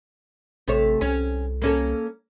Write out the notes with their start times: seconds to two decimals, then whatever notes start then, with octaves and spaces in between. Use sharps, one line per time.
0.68 A1 C3 A3 C#5
1.01 C2 C#4
1.62 A#3 C#4 A4